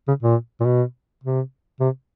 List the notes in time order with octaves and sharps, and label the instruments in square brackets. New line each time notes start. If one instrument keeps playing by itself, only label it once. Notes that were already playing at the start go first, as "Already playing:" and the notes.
[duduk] C#3
A#2
A#2
B2
C3
C3